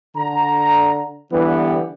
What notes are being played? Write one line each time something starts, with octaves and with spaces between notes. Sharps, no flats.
D3 A#5
D3 E3 G3 B3 G4